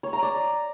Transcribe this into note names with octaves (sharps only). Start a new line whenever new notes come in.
C#5
A#5
D5